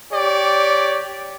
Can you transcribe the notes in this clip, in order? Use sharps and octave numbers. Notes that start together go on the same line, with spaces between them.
G4 C#5 D5